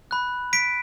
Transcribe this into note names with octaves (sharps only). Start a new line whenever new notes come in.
B5 F#6
B6 D7